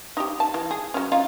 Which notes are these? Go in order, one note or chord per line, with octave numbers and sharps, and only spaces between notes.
D#4 G4
A5
E3
G#4
F#3 C#4
C#4 D#4 F4